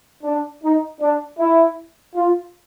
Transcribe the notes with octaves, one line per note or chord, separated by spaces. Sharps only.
D4
D#4
D4
E4
F4